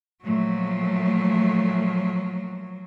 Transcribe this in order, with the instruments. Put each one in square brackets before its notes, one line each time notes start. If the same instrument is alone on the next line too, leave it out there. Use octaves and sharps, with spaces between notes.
[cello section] A#2 A3 [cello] F3 F#3